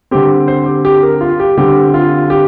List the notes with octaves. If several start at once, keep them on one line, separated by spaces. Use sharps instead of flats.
D3 G3 C4 G4
C5
G4
G4
A#4
F4
G4
D3 G3 C4 G4
F4
G4